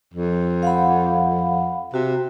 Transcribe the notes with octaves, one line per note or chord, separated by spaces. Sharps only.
F2
F5 F#5 B5
C3 F#4